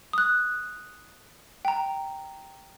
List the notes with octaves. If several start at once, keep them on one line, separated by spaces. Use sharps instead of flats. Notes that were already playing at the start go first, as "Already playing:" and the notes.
D#6 F#6
G5 A#5